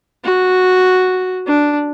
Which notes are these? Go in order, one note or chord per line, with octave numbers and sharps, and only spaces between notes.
F#4
D4